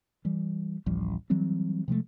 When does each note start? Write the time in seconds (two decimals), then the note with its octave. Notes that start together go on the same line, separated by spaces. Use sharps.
0.25 E3 G3
0.86 A1 D2 F3 G3
1.30 E3 F#3 G3 C4
1.88 C3 F3 G#3 A3